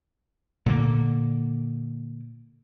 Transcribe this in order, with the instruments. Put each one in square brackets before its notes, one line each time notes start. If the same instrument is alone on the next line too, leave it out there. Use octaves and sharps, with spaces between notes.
[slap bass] A#2 D3 A#3